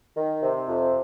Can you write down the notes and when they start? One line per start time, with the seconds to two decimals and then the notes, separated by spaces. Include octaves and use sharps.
0.16 D#3
0.41 C3
0.68 F2